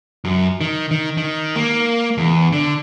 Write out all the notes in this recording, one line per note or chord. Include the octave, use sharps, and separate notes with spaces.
F#2
D#3
D#3
D#3
A#3
E2
D3